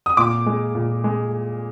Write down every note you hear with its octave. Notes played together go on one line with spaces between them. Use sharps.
D#6
A#2 D6
G#3
A#2
G#3